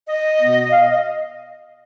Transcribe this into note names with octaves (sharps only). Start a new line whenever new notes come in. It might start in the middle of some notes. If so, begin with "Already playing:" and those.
D#5
B2 B3
F5
D#5
D#5